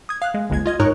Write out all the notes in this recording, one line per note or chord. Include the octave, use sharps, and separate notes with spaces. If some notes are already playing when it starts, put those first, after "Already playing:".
D#6 G#6
F5 F#6
G#3
G1 C#2 G#3 G#6
F4 D#5 G#6
G#2 D#4 A#4 C#5 C#6 F#6